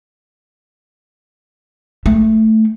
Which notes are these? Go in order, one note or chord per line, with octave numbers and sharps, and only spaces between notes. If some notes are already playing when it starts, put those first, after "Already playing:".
A3